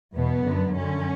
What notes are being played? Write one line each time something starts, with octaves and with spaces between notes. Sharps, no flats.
E2 B2 B3
F#2 D3
F#2 D3 C#4